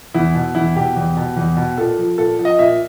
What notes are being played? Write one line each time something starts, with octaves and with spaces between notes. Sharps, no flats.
E2 E4
B2
E2 E4
B2 G4
E2
B2
E2
B2
A#2 A4
F3
A#2 A4
F3
D#5
A#2 E5